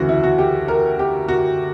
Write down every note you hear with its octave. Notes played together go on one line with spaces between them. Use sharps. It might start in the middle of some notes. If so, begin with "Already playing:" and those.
Already playing: D2 C#3 E3 F#4
E4
F#4
G4
A#4
G4
F#4